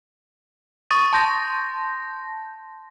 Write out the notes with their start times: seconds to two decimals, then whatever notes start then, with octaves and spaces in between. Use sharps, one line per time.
0.90 C#6 D#6 A6 D#7
1.13 A5 C6 G6 A#6